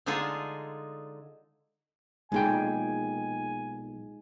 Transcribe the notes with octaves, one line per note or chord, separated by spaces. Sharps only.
D3 G#3 D#4 F4 G#4 A4
B1 A#2 G#3 D#4 G#4 G5 G#5